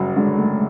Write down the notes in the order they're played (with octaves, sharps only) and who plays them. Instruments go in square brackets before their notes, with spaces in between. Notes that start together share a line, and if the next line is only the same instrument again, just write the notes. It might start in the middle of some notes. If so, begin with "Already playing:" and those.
Already playing: [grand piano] F#1 F#3 [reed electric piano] G3
[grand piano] D3 [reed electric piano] G#3
[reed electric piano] A3